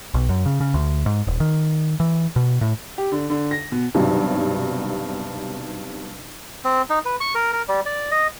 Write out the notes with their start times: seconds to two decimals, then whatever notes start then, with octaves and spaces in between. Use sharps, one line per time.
0.14 B1
0.29 F#2
0.46 C#3
0.60 C#3
0.74 D2
1.06 G#2
1.27 D#1
1.40 D#3
2.00 E3
2.36 B2
2.61 A2
2.98 G4
3.12 D3
3.30 D3
3.51 A#6
3.72 B2
3.95 B1 G2 C3 D#3 F#3
6.64 C4
6.90 D#4
7.05 B4
7.20 C#6
7.35 A#4
7.53 A#4
7.68 G3
7.86 D5
8.11 D#5